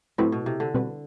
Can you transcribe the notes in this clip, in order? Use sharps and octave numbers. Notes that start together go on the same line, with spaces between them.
A2 F#3 A3 C4 E4 B4
B2
C3
D3
B2 G3 C4 F#4 B4